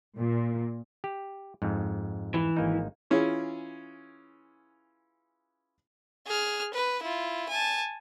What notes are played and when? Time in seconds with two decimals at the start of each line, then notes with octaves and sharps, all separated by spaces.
0.18 A#2
1.04 G4
1.62 F2 G#2
2.34 E3
2.57 G#1 A#3 D#4
3.11 E3 C#4 E4 F4 G#4
6.27 G#4 F6
6.74 B4
7.02 E4 F4
7.49 G#5 A5